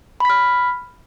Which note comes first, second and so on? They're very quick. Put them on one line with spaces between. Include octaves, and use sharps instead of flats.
B5 B6 F6